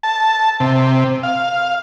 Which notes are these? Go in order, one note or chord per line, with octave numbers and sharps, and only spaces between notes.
A5
C3
F5